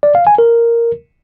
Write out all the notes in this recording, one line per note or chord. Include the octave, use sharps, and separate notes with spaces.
D5
F5
G#5
A#4